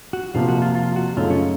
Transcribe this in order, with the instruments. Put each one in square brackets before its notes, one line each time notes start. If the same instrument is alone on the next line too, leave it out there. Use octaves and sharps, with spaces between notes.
[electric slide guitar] F#4
[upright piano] F2 C3 F3 A#3 [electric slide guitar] F4
[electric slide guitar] F#4
F4
F4
F#4
[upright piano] F#2 C#3 A3 D#4 [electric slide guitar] F4
[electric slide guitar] C#4